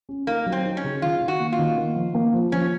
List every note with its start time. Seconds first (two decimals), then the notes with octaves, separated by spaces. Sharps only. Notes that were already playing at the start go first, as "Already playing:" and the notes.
0.09 C#4
0.27 A#3 D#4
0.46 F#3
0.52 C4
0.65 D#4
0.77 C#4
0.84 C#3
1.02 D#3 F4
1.21 D#3
1.28 F#4
1.40 A#3
1.53 F4
1.59 D#3
1.78 A#3
1.96 F3
2.15 A#3
2.34 F3
2.52 F3 C#4